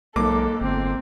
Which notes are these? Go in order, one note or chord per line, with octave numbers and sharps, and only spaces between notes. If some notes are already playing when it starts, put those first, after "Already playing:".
B1 G#2 A#3 A4 D6
G1 C4